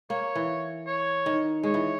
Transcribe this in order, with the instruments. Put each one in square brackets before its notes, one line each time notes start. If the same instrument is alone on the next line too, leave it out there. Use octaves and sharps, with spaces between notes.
[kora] A#3 [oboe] C#5
[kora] E3
[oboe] C#5
[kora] D#3
[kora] G#3 [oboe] C#5
[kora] E3